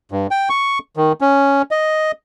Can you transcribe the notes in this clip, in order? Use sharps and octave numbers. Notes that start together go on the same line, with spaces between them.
G2
G5
C#6
D#3
C#4
D#5